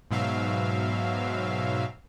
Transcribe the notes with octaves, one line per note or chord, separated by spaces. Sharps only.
G#2 B2 F#3 E5 F5